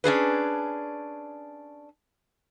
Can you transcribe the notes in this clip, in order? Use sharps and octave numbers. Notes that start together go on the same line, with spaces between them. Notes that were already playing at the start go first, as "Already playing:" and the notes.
C#4 D4 G#4 B4